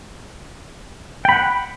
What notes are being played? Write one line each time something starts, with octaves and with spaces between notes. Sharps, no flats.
F#5 G5 B5